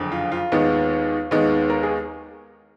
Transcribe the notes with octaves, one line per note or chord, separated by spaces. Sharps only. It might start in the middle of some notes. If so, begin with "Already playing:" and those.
Already playing: F#1 F2 D3
F4
F4
D#2 D#3 G#3 B3
D#2 D#3 G#3 B3
A#4
G#4